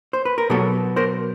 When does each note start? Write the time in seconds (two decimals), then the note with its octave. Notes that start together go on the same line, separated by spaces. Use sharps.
0.13 C5
0.25 B4
0.38 A#4
0.50 B2 F#3 B3 G4 A4
0.96 A#4 C5